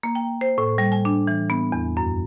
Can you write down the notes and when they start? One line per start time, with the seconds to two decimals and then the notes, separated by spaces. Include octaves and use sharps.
0.03 A#3
0.15 G5
0.41 C5
0.58 A2
0.78 G3
0.92 G#5
1.05 D4
1.27 E3
1.50 B3
1.72 E2
1.97 F#2